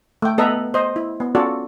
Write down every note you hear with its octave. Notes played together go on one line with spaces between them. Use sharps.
A3 G5
B3 A4 B4 D#5 E5 A#5
C5 D#5
E4
B3
C#4 F4 F#4 A4 D5